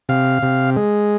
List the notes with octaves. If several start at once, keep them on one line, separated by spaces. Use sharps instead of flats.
C3 F5
C3
G#3